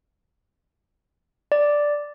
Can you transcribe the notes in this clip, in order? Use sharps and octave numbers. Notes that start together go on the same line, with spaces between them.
D5